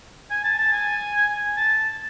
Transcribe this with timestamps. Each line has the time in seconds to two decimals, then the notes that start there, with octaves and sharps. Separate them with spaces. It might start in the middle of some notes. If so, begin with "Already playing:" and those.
0.31 G#5
0.44 A5
0.58 A5
0.72 G#5
1.57 A5